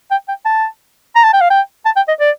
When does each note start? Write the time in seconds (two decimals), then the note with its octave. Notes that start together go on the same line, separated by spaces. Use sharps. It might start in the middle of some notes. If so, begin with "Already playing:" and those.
0.11 G5
0.28 G5
0.45 A5
1.16 A#5
1.24 A5
1.33 G5
1.41 F5
1.50 G5
1.86 A5
1.96 G5
2.08 D#5
2.20 D5